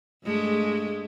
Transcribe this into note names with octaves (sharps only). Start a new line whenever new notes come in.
G2 G#3 A3